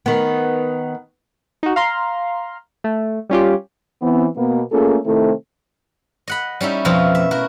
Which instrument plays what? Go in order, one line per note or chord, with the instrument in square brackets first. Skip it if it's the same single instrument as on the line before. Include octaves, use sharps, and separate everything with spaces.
[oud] D#3 B3
[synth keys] D#4 F#4
F5 A#5 C6
A3
G3 C#4 F4 G4
[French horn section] E3 B3 C4
B2 A#3 B3
A3 A#3 C#4 F4 G#4 A4
C3 D#3 A3 C4 E4 A4
[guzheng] D#5 F#5 B5
G3 C#4 D#4 E4
F2 B2 F3 A3 E4 F4
E5
E4 F#4 A#4